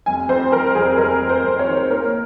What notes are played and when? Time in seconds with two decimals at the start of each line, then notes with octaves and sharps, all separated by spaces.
0.06 F1 G#5
0.29 F2 C5
0.52 F2 A#4
0.75 F1 G#4
0.98 F1 A#4
1.22 F2
1.29 C5
1.44 F1
1.59 C#5
1.67 D#3
1.90 A#3 A#4